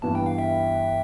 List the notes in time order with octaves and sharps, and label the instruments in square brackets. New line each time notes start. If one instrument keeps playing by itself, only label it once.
[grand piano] G2 E3 B3 [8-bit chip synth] A5
[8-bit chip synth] G5
F5
E5 G5